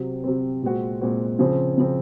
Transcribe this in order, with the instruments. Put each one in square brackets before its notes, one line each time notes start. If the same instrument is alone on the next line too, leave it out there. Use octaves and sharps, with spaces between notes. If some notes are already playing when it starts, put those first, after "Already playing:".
Already playing: [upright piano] C3 F#3 C4
C3 F#3 C4
A#2 G#3 C4 F#4
A#2 G#3 C4 F#4
C#3 F3 C4
C#3 F3 C4